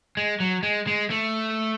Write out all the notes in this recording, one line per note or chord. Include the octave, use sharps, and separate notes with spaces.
G#3
F#3
G#3
G#3
A3